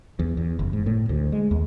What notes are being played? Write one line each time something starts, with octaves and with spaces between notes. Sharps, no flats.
E2
E2
F#1
G#2
A2
D2
G#3
D#2